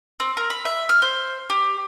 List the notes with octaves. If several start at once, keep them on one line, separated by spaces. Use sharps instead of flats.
C4
A#4
B5
E5
F6
C5
G4